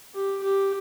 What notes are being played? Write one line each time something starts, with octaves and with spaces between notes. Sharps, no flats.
G4
G4